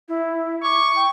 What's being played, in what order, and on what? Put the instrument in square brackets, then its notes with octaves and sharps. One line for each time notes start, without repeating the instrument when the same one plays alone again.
[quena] E4
[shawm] C#6 [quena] D6
[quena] G5